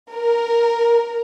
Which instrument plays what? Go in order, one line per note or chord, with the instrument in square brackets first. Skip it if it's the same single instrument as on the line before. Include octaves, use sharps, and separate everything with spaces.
[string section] A#4